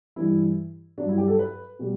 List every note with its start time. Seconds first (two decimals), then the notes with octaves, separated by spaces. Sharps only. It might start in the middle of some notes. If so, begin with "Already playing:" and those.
0.16 G2 E3 G3 E4
0.98 G2 F#3 D4
1.09 E4
1.18 G4
1.28 A4
1.39 B4
1.79 B2 G3